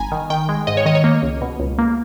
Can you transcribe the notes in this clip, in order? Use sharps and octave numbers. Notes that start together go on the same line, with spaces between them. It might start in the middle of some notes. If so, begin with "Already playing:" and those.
Already playing: G1 G#5 A#5 B5
D#3
D#3 G5
G#3
G#2 D#5
C#5
D#3 D#5
C#5
A#3
C#2
B2
C#2
A#3